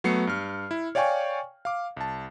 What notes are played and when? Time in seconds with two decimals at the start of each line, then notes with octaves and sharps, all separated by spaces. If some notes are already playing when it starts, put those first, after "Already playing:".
0.04 F#3 A3 B3 C7 C#7
0.27 G2 F6
0.71 E4
0.95 C#5 D5 F5 G5 G#5 C#6
1.65 F5 D6
1.97 C2 A5